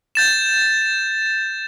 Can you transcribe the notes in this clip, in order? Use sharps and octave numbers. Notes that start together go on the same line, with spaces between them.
G6 A6 E7